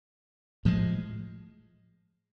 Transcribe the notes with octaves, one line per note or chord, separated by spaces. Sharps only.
A2 F3 G#3